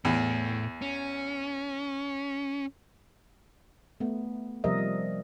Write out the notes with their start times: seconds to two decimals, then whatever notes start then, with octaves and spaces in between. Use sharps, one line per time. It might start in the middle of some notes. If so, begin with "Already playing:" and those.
0.05 E2 A2
0.82 C#4
4.00 A3 B3
4.64 C3 F3 G3 A#4 D#5 E5
4.78 G3